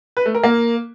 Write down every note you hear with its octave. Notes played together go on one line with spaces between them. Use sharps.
B4
A3
A#4
A#3